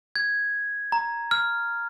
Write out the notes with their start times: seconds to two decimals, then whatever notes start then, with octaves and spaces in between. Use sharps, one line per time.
0.16 G#6
0.92 A#5
1.31 F6